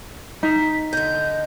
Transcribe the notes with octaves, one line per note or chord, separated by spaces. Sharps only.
D#4 B6
D3 D#5 G6